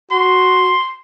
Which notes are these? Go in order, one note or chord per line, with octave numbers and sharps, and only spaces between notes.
F#4 C6